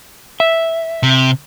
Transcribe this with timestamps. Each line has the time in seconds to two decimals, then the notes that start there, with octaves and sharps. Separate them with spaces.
0.40 E5
1.03 C3